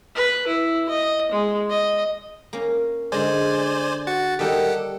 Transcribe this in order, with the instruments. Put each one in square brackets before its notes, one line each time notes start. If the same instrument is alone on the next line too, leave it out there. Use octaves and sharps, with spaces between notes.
[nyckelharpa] B4
E4
D#5
G#3
D#5
[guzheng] A#3 C#4
[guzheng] D3 G#3 [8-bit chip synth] C5 D5 G#5
[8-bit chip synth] F#4 F#5 A6
[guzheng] D#3 G3 A#3 [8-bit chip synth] G4 A4 F#5